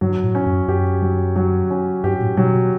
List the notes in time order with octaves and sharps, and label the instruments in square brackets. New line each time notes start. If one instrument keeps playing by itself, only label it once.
[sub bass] G2 [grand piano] F#3
[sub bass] A2
[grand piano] C#4
[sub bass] F#2
[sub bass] F#2 [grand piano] G4
[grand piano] F#3
F#3
C#4
[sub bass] G2 [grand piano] G4
[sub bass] A2
[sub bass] B2 [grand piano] F#3
[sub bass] B2